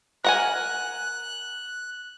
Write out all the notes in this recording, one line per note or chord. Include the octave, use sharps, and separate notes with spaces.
A#4 F#5 G#5 F#6